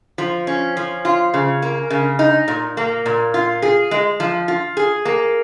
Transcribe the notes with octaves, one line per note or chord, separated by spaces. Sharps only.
F3
C#4
F3
F4
C#3
A#3
C#3
D#4
A#2
A#3
A#2
F4
G#4
G#3
F3
F4
G#4
A#3